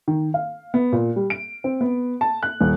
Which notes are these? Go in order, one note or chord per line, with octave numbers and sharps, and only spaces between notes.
D#3
F5
B3
A#2
G3
D7
C4
B3
A5
F#6
D#1